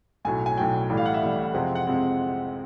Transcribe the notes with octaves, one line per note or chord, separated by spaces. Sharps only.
B1 A2 F#3 G#5
G#5
B1 A2 F#3 G5
A1 A2 E3 G3
F5
F#5
E5
A1 A2 E3 G3
F2 C3 F3 G#3 C4 F#5
F#5
F2 C3 F3 G#3 C4